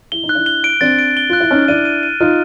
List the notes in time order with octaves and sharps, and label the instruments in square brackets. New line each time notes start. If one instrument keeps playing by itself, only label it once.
[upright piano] E4 [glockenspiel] G7
[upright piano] D#4
[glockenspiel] F#6
[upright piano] D4 E4
[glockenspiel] G7
D7
[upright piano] C4 D4 [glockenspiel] A6
[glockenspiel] D7
G7
[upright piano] F4 [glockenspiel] F#6
[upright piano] E4
[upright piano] C#4 D#4 [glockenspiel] F6
[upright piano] D4 E4 [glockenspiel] D#7
[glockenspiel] D#7
D#7
[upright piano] D#4 F4 [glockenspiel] F6